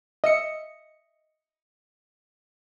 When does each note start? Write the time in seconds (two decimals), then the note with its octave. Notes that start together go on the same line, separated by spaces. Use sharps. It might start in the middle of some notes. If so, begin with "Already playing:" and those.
0.24 D#5 E5 C#7